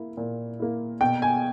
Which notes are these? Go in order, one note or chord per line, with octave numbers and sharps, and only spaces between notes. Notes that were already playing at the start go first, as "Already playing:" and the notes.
Already playing: A#3 E4
A#2
A#3 E4
B2 G5
G#5